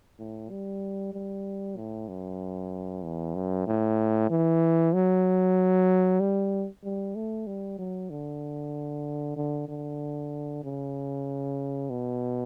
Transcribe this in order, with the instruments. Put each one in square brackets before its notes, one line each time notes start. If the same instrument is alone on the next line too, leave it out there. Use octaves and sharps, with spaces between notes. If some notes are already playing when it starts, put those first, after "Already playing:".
[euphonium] A2
G3
G3
A2
F#2
E2
F#2
A2
E3
F#3
G3
G3
A3
G3
F#3
D3
D3
D3
C#3
B2